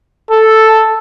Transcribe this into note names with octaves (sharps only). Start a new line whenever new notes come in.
A4